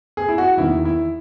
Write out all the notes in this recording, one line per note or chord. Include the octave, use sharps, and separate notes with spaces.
G#4
E4
F#4
E2 D#3 A#3 E4
E4